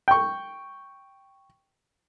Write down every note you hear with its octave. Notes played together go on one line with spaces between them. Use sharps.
G5 C#6